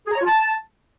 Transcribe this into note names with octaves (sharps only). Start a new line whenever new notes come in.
G#4
A#5
C#5
F4
A5